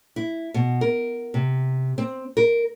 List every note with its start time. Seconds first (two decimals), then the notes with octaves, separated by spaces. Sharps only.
0.16 E4
0.54 B2
0.81 A#4
1.34 C3
1.98 C4
2.37 A#4